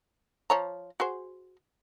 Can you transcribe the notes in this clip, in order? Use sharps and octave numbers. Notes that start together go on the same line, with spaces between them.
F3 C#5 A#5
F#4 G#4 C5